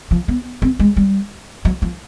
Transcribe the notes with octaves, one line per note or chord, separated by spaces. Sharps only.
F3
B3
C4
G#3
G3
F#3
F3